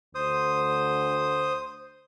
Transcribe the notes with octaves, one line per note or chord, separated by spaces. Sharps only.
D2 C5 D#6